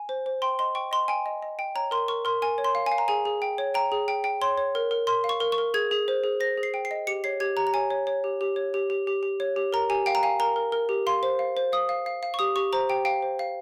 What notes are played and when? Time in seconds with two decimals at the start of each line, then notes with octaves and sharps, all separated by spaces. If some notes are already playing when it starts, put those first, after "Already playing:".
Already playing: G#5
0.09 C5
0.26 C5
0.42 G5 C6
0.59 D#5 C6
0.75 G5 C#6
0.92 D#5 C6
1.08 G5 G#5
1.26 D#5
1.42 D#5
1.59 G5
1.75 C#5 A#5
1.91 A#4 C6
2.08 A#4 C#6
2.25 A#4 C6
2.42 A#4 G#5
2.58 C#5
2.64 C6
2.75 F5
2.86 G#5
2.92 F5
2.98 A#5
3.08 G#4 G#5
3.25 G#4
3.42 G5
3.58 C#5
3.74 G5 A#5
3.92 G#4
4.08 G5
4.24 G5
4.41 C#5 C6
4.58 C#5
4.75 A#4
4.91 A#4
5.07 A#4 C6
5.24 F5
5.29 C#6
5.40 A#4
5.52 C#6
5.58 A#4
5.74 G#4 G#6
5.91 G#4
6.08 C5
6.24 G#4
6.40 C5 A#6
6.58 G#4
6.63 C7
6.74 G5
6.85 C7
6.91 D#5
7.07 G4 C#7
7.24 C#5 C7
7.40 G4 G#6
7.57 G4 A#5
7.67 A#5
7.74 C#5 G#5
7.90 C#5
8.07 C#5
8.24 G4
8.41 G4
8.56 C#5
8.74 G4
8.90 G4
9.07 G4
9.23 G4
9.40 C#5
9.56 G4
9.73 A#4 A#5
9.90 G4 G#5
10.06 F5 G5
10.15 A#5
10.23 F5 G#5
10.40 A#4 A#5
10.56 A#4
10.72 A#4
10.89 G4
11.07 F5 C6
11.23 C5
11.39 F5
11.57 C5
11.72 F5 D#6
11.89 F5
12.06 F5
12.23 F5
12.34 C#6
12.39 G4 D#6
12.56 G4 C#6
12.73 C5 A#5
12.89 G4 G5
13.05 F5 G5
13.22 C5
13.39 F5